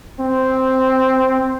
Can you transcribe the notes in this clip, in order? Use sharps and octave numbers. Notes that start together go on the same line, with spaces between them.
C4